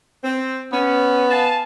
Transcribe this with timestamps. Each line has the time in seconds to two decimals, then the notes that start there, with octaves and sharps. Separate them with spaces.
0.24 C4
0.73 B3 C#4
1.30 F5 G#5 A5